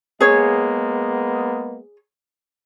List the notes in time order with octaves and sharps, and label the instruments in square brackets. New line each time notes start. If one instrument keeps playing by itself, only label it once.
[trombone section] G#3 A#3 B3 [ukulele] G#4 C#5